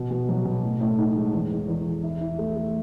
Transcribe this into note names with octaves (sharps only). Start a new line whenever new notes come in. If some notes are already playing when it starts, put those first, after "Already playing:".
Already playing: B2
B2
F#3
B2
A2
A2
D#4
G#3
E2
E2
E2
E2
E4
E4
A3
A3